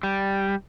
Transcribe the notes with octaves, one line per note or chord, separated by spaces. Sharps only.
G3